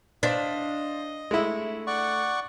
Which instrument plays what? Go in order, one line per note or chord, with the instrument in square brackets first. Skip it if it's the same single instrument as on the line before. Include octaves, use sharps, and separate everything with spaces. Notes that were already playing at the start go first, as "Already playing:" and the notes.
[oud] D4 [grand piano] C5 F5 B6 [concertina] D#5
[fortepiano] G#3 E4 [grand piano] A3
[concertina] D5 F#5 C#6